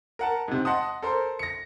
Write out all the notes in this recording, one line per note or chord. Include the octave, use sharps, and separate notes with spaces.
A#4 F#5 A5
G#2 C3
D#5 F#5 A5 C6 D#6
A4 A#4 C5
A#6 C#7